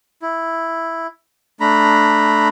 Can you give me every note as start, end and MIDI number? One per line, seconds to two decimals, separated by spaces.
0.22 1.07 64
1.60 2.48 57
1.60 2.48 62
1.60 2.48 82
1.60 2.48 83